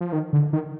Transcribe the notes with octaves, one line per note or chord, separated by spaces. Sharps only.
F3
D#3
D3
D#3